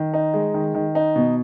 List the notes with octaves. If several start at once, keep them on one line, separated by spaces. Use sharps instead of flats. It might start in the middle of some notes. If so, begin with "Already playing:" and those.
Already playing: D#3
D#4
G#3
D#3
D#3
D#4
B2